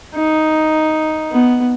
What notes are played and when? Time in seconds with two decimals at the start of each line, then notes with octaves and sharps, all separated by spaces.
0.15 D#4
1.32 B3